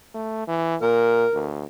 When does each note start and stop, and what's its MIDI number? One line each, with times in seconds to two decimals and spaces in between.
0.14 0.44 57
0.48 0.76 52
0.81 1.26 46
0.81 1.48 70
1.34 1.65 38